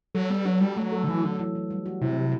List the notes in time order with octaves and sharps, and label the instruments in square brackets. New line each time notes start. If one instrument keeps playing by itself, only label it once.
[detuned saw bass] F#3 [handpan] A4
[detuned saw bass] G3 [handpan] B3
[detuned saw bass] F#3 [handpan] D4
[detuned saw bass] G3 [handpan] F#4
[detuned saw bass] F#3 [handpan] A3
[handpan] A4
[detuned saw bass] D3
[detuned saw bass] E3 [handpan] F#3
[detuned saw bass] D3 [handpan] F#3
[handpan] E3
E3
G3
F#4
[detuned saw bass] C3 [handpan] E4
[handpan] F#3